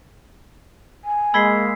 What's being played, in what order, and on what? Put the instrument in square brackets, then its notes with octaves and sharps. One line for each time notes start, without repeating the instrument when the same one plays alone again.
[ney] G#5
[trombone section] G#3 A#3 [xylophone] B5 G#6 G7 [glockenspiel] E6 B6 C7